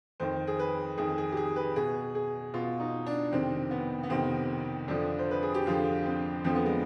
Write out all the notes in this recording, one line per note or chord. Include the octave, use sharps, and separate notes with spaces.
F2 D#3 C5
G#4
B4
F2 D#3 G#4
G#4
G4
G#4
B4
B2 G#4
G#4
B2 F4
D#4
D4
F2 C3 D#3 C4
B3
B3
F2 C3 D#3 C4
F2 D3 F3 D4
C5
B4
G#4
G4
F2 D3 F3 F4
C4
F2 D3 F3 C4
B3
G#3